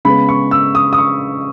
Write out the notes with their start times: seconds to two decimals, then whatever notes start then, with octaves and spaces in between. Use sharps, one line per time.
0.05 C#3 G#3 B3 B5
0.29 C#6
0.51 E6
0.75 D#6
0.93 D#6
0.98 C#6